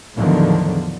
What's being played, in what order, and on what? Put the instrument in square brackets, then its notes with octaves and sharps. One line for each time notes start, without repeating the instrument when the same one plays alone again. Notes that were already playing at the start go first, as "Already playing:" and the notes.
[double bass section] E2 A2 D3 D#3 F3 F#3